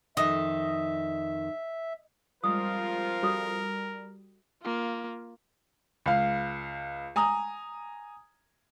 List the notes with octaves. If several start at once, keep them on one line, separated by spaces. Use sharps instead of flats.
F2 D#3 D#5 E5
F3 G3 G#3 C4 F4 A#4 D#6
G3 F#4 A4 D#6
A#3 F4
C#2 F5
G#5 A#5 D#6